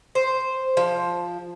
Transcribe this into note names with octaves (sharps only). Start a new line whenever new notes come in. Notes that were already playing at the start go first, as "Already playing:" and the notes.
C5
F3